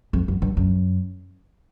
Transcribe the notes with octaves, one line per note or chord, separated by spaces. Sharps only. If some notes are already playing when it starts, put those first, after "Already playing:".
F2
F#2
G2
F#2